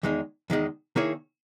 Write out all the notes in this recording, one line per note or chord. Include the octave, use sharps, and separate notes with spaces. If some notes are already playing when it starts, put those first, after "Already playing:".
E2 D#3 G#3 D#4
E2 D#3 G#3 D#4
D#3 A#3 E4 G#4 C#5